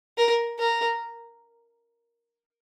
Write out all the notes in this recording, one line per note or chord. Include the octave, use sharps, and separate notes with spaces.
A#4
A#4